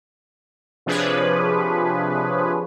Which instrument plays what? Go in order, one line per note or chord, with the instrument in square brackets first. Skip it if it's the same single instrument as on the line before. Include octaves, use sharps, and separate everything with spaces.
[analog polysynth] C3 F3 D4 G#4 B4 C#5